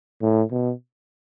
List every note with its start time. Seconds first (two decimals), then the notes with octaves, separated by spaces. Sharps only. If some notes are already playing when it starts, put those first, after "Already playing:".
0.22 A2
0.51 B2